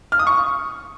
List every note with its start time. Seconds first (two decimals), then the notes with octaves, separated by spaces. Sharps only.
0.12 F6
0.19 D#6
0.27 C#6